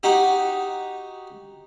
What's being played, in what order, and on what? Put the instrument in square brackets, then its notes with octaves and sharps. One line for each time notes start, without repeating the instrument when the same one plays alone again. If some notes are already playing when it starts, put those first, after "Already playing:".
[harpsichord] D#4 F#4 G4